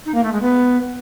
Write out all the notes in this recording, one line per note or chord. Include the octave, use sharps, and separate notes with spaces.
D#4
A#3
A3
G#3
B3